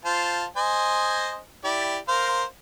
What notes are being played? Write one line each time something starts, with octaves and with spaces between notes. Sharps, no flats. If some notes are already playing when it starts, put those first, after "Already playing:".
F4 C5 A5
C5 D#5 G#5
E4 G4 D5
A#4 C5 F5